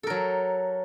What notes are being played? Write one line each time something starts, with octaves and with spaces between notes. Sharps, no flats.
F#3 A4 A#4